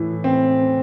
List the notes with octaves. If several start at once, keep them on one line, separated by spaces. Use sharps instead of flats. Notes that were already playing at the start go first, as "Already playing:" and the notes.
Already playing: A2 E3
C4